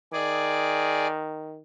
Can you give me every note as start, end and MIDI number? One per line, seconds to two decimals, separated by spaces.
0.13 1.61 51
0.13 1.07 68
0.13 1.07 74